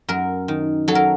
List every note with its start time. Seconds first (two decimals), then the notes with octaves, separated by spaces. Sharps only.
0.08 F#2 A#4
0.48 D#3
0.88 F#3 A4
0.95 A#4